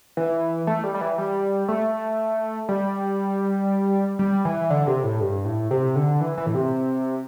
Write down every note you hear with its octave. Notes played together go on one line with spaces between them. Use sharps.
E3
A3
G3
G3
E3
G3
A3
G3
G3
E3
D3
C3
A2
G2
A2
C3
D3
E3
E3
A2
C3